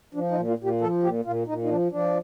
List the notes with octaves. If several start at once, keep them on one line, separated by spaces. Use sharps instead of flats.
F3 D4
D#4
A#2
F4
A#2
G4
F3 A4
A#2 G4
A#2 F4
A#2 D#4
D#4
F3 D4
F3 D4